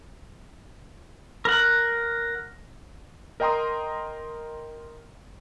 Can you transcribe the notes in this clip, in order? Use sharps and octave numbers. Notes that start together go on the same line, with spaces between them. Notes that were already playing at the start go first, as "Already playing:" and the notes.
A#4 F#5
A#4 D#5 G5 A#5 C6 D#6